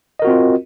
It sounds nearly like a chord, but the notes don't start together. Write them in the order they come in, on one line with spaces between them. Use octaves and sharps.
D#5 A#4 F#4 C4 F4